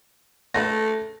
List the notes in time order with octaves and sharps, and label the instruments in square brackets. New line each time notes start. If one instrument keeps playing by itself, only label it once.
[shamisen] C#3 A4 B4 [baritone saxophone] A3 [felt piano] A#6